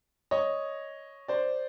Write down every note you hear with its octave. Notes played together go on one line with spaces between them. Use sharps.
C#5 D#5
C5 D5